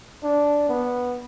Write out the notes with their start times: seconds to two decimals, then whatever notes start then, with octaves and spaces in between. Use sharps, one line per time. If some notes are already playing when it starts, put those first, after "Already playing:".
0.24 D4
0.69 B3